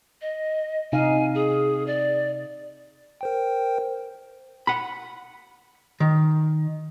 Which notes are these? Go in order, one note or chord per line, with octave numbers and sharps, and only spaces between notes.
D#5
C3 D#4 F5 G#5
G#4
D5
A#4 C5 G5
F#5 B5
D#3